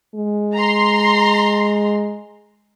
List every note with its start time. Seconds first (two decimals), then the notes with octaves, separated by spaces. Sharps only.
0.15 G#3
0.55 A#5 C6